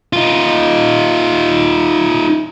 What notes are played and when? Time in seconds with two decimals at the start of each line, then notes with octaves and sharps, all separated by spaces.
0.13 D#4 F4